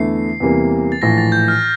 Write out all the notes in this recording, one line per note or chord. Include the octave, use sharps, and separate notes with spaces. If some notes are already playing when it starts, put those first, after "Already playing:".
Already playing: E2 D3 A3 E4 C7
E2 C3 E3 G3 A#3
A6
A#1 A2 E3 A#6
A6
G6
F6